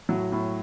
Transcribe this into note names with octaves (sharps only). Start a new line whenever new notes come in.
A2 F#3
A2